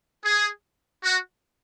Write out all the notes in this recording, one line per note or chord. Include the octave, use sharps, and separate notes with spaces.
G#4
F#4